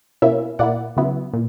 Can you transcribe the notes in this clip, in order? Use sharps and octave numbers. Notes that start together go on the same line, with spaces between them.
B2 A#3 C#4 E4 E5
A#2 A#3 E4 D5 F#5
C#3 F#3 B3 E4
A#2